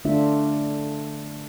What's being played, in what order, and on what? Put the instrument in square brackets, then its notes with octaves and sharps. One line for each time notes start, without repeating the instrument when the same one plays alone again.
[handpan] D3 A3 D4 F4 E5